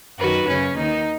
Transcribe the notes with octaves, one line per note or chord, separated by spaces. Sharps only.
F#2 D#3 F#4 B4
F#2 C#3 C#4
D#2 D#3 D#4